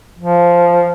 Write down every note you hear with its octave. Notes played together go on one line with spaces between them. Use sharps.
F3